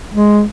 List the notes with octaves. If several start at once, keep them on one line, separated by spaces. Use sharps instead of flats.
G#3